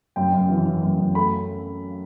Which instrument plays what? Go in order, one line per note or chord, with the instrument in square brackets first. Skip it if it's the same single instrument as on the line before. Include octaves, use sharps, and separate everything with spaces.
[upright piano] F#2 G5
F#2
E3
E3
F#2
F#2
A3 B5